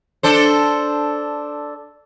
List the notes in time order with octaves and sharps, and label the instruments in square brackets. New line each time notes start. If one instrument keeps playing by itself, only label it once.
[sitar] D4 A4 C5